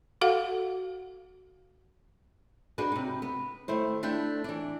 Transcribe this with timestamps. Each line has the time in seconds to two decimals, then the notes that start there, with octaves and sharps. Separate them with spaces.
0.21 F#4 A4 F5 F#5
2.78 D4 D#4 F#4 G#4 B4
2.92 C3 D#4
3.22 B3
3.68 D#3 A3 E4 C5
4.03 A3 D4 E4 G5
4.44 E3 D4